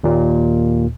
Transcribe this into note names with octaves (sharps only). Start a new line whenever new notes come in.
D#2 A#2